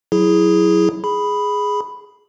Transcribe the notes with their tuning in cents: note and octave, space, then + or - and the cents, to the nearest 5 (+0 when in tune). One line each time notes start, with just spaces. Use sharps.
F#3 +0 E4 +0 G#4 +0
G#4 +0 B5 +0